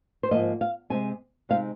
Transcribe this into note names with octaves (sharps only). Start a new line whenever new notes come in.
C5
G#2 F3 A#3 D#5
F5
C3 G#3 C4 G#5
C3 G#3 C4 D#4 F5